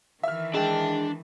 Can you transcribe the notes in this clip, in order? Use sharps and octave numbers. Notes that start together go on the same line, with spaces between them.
D#3 E3 E5 F6
G#3 D4 G5 A5